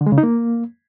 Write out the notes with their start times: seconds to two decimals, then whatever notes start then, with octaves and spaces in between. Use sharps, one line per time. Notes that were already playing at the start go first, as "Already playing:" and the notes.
0.01 D3
0.06 G#3
0.12 C#3
0.18 D#4
0.23 A#3